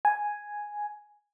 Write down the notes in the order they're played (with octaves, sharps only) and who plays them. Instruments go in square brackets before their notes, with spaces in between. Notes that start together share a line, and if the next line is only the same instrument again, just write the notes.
[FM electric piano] G#5